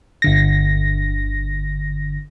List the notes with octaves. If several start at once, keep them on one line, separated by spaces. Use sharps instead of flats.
G1 D3 A#6